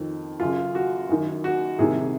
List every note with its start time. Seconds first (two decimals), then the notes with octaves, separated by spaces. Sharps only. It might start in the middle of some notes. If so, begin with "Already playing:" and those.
Already playing: F2 D#3
0.40 F#2 C#3 F4
0.75 F#4
1.09 F#2 D#3
1.44 F#4
1.78 C2 C3 D#3 G#4